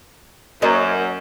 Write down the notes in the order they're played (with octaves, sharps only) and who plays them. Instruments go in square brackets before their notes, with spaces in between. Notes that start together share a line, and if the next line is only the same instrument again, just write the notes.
[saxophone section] F#2 [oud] A#3 C#5 D#5